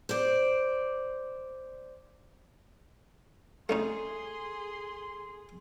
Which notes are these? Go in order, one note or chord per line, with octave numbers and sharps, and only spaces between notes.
C5 D5
A3 C#4 D#4 G#4 A4 C6